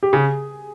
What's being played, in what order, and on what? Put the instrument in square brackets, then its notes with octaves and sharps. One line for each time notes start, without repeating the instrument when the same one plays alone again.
[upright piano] G4
[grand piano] C#3 [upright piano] G#4